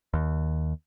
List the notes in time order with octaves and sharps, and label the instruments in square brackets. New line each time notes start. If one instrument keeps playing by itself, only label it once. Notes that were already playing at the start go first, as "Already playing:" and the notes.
[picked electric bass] D#2